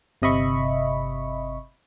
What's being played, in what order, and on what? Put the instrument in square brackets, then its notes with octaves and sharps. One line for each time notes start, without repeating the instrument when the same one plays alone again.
[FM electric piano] G1 C3 D#5 E5 B5 C#6